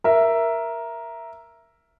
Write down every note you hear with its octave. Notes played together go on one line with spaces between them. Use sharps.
A#4 E5